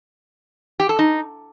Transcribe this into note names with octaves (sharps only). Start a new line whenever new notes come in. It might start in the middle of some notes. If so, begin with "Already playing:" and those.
G4
A4
D#4